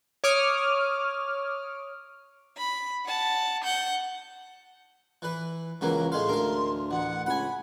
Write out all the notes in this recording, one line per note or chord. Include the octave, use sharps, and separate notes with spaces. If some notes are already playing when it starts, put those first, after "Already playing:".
C#5 D6 D#6 F6
B5
F#5 A5
F#5 G6
E3 B4
C#2 E3 F#3 A#3
A2 G#3 F5 C6
D2 A#4 F5
A1 F#5
C#2 F#5 G#5 B5